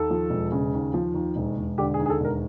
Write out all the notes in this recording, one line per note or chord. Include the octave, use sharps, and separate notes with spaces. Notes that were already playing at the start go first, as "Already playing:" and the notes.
Already playing: D#2 A4
F3
E1
C#3
D#2
F3
D#2
E1
E1
D3 G4
G#4
D#2
G#4
A4
E1 A#4